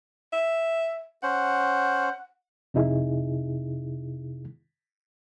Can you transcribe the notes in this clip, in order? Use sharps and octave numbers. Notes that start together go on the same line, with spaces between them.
E5
C#4 C5 F#5
F2 C3 D#4 E4 G#4